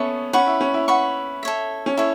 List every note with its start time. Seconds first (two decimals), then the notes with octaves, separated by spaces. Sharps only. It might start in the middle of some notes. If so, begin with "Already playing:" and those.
Already playing: B3 C#4 A4 E5 C#6
0.33 C#4 B4 F#5 C#6
0.47 E4
0.61 C#4
0.74 E4
0.88 B4 F#5 C#6
1.43 A4 C#5 E5
1.86 C#4
1.97 E4 A4 C#5